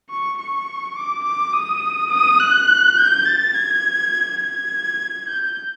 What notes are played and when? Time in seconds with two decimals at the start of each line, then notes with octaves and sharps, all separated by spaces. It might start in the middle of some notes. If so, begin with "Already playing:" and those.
0.10 C#6
0.39 C#6
0.96 D6
1.25 D6
1.54 D#6
2.11 D#6
2.40 F#6
2.97 G6
3.26 A6
3.55 G#6
4.42 G#6
5.27 G6